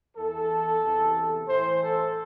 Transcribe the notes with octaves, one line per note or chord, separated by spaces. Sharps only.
E2 E3 A4
E2 C3 E3
A2 E3 C5
A4